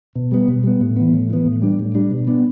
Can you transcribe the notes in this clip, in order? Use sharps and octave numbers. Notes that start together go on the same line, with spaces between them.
B2
G3 B3
B2
G3 B3
A2
E3 B3
A2
E3 B3
A2
G3 D4
A2
G3 D4
B2
B3 D4